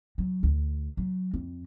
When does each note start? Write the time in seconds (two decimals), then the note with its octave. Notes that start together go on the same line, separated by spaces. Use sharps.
0.18 F#3
0.43 D2
0.97 F#3
1.34 F2